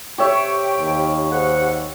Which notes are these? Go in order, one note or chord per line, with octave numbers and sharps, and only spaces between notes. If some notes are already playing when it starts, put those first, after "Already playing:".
C3 G4 C#5 E5 G5 C#6
D#2
G#2 F#5